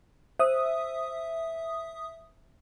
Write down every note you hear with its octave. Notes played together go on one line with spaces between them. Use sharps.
C5 E5 D#6